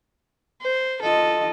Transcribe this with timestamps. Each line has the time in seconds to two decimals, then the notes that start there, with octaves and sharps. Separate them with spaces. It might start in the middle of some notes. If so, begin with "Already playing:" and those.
0.62 C5
1.02 F4 A4 D#5